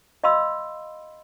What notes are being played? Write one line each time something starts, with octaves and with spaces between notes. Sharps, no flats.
D#5 F5 B5 C6 E6